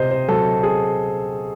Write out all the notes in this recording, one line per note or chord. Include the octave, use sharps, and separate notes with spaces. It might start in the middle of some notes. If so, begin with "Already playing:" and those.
Already playing: C3 C4 C5 D#5
C5
F#3 A4
G#4